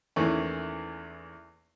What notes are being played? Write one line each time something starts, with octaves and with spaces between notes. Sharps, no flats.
E2 D#3 E3 A3 A#3 C#4